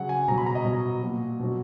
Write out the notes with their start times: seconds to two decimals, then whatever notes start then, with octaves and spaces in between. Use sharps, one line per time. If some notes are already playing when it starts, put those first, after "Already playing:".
Already playing: C#3 F#3 F#5
0.09 G#5
0.28 B2 F#3 A#5
0.38 B5
0.46 A#5
0.55 D#5
0.65 B2 F#3
1.02 A#2 F#3
1.39 B2 F#3